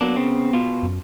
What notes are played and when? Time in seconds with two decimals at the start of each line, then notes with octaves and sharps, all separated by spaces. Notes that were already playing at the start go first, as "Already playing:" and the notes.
0.01 F#3 A#3 B3 D4
0.16 C#3 C4
0.53 B2 F4
0.83 F#2